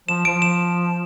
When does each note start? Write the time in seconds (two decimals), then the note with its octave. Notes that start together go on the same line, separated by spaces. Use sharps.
0.08 F3 E7
0.25 F3 D7
0.42 E7